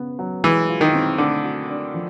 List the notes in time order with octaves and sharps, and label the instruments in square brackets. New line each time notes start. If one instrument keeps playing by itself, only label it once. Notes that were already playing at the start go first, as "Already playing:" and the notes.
Already playing: [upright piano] C#3 B3
F#3
[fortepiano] E3 [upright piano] G#3
[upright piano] F4
[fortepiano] D#3
[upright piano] C4
[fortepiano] D3 [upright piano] A3
[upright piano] F#4
D4
F3